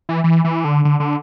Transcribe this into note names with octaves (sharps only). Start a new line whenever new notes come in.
E3
E3
E3
D3
D3
D3